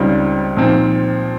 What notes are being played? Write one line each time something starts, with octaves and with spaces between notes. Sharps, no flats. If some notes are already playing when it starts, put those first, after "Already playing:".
Already playing: C#2 C#3 G3 C4 D#4
A#2 F3 C4 D#4